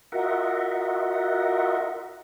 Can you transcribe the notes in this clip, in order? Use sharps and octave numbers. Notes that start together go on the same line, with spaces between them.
F4 F#4 A#4 D#5 E5 F#5